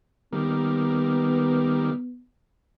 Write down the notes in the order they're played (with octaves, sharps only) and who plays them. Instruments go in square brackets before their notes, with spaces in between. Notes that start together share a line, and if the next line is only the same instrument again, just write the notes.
[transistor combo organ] D#3 G3 A#3 [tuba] B3